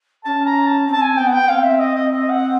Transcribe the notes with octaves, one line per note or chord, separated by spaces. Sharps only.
C#4 A5
A#5
A5
C4
A5
G#5
B3 G5
F#5
G5
B3
C4 F5
E5
D#5
D#5
D#5
F#5